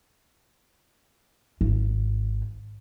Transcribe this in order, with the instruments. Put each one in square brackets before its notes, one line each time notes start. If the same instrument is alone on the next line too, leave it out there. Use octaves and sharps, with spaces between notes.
[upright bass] G#1